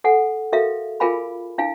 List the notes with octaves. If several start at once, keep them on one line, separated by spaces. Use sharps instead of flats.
A4 F#5 G#5
F#4 A4 A#4 E5 F5
F4 G#4 A#4 F5 G#5 B5
D4 E4 F5 G#5